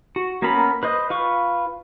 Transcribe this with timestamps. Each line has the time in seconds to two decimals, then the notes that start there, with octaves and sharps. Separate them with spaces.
0.16 F#4
0.42 A#3 B3 C#4 A#4 B5
0.83 B4 C5 D#5
1.10 F4 B4 C#6